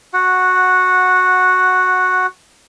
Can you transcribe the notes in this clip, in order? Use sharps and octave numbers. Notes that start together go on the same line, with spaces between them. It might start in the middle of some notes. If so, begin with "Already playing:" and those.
F#4 F#5